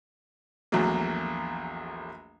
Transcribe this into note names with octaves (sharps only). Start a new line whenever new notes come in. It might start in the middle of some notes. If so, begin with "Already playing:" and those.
A#1 E2 F#3 A3 A#3